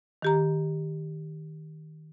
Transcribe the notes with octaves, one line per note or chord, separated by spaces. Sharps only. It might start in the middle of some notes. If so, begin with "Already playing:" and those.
D#3 G4 A#5